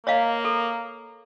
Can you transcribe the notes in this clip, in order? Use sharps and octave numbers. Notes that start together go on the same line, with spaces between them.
A#3 C#5 D#5 F5
A4